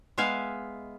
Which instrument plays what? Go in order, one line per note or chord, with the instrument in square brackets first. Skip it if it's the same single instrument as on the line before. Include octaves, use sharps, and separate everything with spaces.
[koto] G#3 B3 E5 F5 G#5